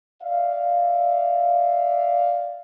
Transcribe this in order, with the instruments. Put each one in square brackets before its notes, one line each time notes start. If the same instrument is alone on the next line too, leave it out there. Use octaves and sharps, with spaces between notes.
[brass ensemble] D5 E5 F5